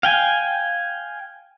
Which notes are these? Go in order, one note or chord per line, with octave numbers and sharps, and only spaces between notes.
F5 G5 G#5